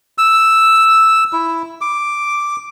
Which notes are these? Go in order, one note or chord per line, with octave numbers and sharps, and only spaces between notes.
E6
E4
D6